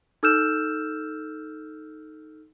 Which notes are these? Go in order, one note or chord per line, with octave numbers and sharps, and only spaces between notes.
D#4 A4 E6 F6 G6 E7